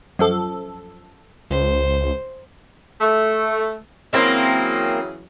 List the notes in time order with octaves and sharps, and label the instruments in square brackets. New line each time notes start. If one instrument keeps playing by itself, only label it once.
[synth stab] F#2 F3 A4
[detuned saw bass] C#2 [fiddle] C5
[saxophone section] A3
[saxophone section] C#3 E3 F#3 [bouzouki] A#3 C4 E4